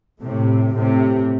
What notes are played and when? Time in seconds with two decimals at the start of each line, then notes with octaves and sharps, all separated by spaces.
0.22 A2 C3
0.73 A2 C3